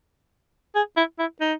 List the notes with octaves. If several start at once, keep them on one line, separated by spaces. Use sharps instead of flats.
G#4
E4
E4
D#4